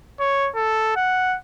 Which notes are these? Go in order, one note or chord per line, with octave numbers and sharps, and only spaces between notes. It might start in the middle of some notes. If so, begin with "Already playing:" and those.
C#5
A4
F#5